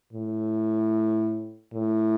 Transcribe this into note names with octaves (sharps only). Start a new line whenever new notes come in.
A2
A2